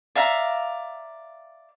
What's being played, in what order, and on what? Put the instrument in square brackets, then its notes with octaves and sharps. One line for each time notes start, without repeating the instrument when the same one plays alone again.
[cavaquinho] D5 E5 F5 A#5